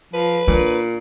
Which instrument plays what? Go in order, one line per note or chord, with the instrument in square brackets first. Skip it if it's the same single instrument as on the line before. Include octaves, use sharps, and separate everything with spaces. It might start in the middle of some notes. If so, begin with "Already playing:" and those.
[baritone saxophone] F3 [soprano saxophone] B4
[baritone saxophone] A#2 [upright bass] D4